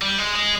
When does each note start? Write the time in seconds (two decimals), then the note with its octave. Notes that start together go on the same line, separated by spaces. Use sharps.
0.02 G3
0.18 G#3
0.35 G#3